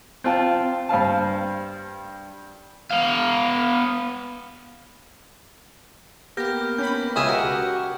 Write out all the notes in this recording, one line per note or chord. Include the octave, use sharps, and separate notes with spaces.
C4 F4 G5 A5
G2 C5 F5 A5
B3 F5
A#3 B3 G4 G5 F6 G6 A#6
C#4 B5 G6
C#2 G#4 E5
F#4 G4 A#4 F#5